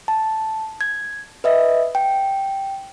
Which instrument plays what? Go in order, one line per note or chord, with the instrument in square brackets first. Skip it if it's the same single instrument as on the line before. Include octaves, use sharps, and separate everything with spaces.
[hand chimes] A5
G#6
B4 D#5 E5
G5